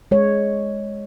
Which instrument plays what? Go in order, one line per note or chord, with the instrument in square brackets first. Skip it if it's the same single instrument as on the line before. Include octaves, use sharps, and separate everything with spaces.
[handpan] G#3 C#5